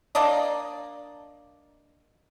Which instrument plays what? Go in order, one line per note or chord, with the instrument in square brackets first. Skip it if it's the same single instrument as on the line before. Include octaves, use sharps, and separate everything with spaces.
[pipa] A#3 D4 D5 D#5